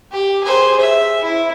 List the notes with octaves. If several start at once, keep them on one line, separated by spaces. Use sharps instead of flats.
G4
G#4 C5
E5
E4